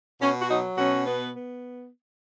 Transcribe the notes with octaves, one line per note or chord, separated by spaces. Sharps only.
B2 C#4
F#4
F#3 D#4
B2 C#4 F#4
B3
B3